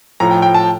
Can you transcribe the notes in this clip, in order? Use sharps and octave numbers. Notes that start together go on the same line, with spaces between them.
A2 F3 A#5
G5
G5
A5